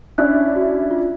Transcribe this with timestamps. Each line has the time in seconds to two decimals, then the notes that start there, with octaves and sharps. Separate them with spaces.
0.18 C#4 D4 E4 F#6
0.56 F#4
0.91 F4